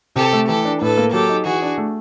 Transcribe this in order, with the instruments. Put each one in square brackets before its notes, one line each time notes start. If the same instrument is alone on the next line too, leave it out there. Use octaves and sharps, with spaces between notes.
[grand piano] C3 [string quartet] G4 A4
[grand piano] A3
[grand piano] E3 [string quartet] G4 A4
[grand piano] D4
[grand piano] A2 [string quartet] A4 B4
[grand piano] A#3
[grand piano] F#3 [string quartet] G4 A4
[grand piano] D#4
[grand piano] E3 [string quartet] F#4 G#4
[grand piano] D4
A3